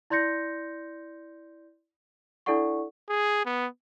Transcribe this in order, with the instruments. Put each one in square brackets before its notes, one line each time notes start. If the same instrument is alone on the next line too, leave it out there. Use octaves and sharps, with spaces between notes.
[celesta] E4 D5 C6 G6 A#6 C#7
D4 E4 A4 D5 F#5 C#6
[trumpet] G#4
B3